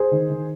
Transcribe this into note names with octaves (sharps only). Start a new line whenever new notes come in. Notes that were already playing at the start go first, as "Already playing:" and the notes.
Already playing: G#4 C5
D#3
D#3